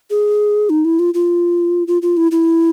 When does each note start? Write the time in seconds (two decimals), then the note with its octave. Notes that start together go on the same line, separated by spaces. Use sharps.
0.10 G#4
0.70 D#4
0.85 E4
0.99 F4
1.14 F4
1.87 F4
2.02 F4
2.17 E4
2.32 E4